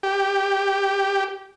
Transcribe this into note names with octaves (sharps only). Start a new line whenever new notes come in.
G4